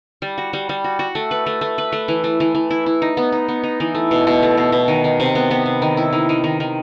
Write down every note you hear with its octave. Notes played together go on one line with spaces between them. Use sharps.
G3
F#4
G3
G3
F#4
F#4
A3
B4
A3
A3
B4
A3
E3
A3
E3
E3
E4
E4
D#4
B3
D#4
B3
D#4
E3
A3
B2
B2
A3
B2
B2
D#3
D#3
C3
B3
B3
C3
D#3
E4
D#3
D#3
D#3
D#3